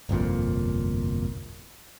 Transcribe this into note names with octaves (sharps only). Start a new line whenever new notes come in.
G1 C2 F2 A#2